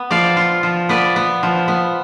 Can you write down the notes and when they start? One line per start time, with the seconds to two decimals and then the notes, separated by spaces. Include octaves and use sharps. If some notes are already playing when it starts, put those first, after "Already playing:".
Already playing: B3
0.11 F3 D5 F5
0.37 F4
0.63 F3
0.89 B3 B4 D5
1.16 B3
1.43 F3
1.68 B3